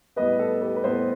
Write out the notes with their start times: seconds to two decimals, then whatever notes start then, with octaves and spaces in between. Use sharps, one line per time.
0.16 A2 G3 B3 B4 D#5
0.39 A4
0.61 G4 B4
0.76 B4
0.84 A2 G3 B3 A4 C5